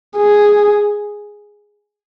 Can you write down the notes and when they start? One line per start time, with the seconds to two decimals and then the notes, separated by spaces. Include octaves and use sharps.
0.17 G#4